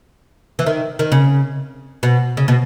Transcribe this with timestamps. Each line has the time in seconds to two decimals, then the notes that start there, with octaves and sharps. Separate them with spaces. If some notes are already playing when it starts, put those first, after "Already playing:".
0.59 E3
0.66 D#3
0.99 D#3
1.12 C#3
2.03 B2
2.37 C#3
2.48 B2